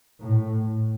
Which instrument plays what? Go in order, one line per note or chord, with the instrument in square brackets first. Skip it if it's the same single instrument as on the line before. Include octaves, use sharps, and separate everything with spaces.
[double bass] A2